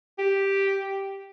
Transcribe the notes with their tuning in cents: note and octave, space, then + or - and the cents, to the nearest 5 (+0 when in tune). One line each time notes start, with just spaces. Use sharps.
G4 +0